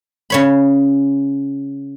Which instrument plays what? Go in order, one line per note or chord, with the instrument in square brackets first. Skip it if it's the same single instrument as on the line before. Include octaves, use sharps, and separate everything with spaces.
[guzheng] C#3 C#5 B5